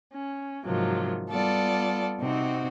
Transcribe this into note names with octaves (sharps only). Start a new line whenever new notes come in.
C#4
G#2 C3 D#3 F3 F#3
G3 B3 F4 A4 D5
C3 C4 D#4 F#4